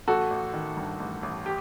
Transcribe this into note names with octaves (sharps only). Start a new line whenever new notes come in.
A1 F#4 A4
A1
D#3
G2
A1
A1
G4